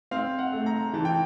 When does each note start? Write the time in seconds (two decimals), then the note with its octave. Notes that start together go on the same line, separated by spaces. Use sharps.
0.11 C4 F5
0.39 F#5
0.52 A3
0.66 A#5
0.93 E3 A5
1.05 G5